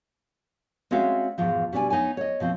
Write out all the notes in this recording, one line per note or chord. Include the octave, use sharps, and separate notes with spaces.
G#3 C4 C#4 F#4 E5 F5
E2 G#2 B2 F3
B2 G3 D4 D5 G5 G#5
B3 D#4 C#5 G#5
C#5 D#5
B2 F3 C4